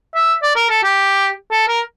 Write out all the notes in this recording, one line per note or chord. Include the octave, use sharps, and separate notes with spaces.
E5
D5
A#4
A4
G4
A4
A#4